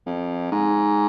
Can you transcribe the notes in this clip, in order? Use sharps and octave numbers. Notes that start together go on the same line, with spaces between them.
F2
G#2